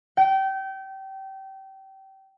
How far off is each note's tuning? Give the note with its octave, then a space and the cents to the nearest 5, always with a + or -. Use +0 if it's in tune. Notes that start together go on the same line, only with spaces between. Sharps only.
G5 -25